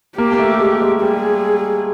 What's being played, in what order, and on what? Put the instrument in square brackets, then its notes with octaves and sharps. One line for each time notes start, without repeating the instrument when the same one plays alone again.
[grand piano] A#3 [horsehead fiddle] G4
[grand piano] A#3
A3
G#3
G#3
[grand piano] G3 [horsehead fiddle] G#4